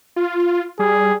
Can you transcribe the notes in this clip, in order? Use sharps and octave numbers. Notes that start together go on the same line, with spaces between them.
F4
G3 G#4